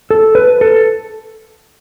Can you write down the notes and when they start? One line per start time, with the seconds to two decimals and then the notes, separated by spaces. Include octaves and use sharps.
0.10 A4
0.35 B4
0.61 A4